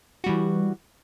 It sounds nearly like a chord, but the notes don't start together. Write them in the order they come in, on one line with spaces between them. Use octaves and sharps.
F#4 G3 E3